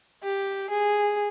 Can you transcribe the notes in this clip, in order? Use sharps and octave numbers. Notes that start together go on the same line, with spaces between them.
G4
G#4